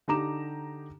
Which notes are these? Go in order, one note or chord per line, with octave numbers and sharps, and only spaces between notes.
D3 D#4 G4 A#5 D6 E7